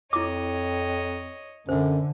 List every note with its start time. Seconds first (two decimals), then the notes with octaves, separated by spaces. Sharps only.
0.13 F2 E4 C#5 D#5 D6
1.69 F#2 D3 C5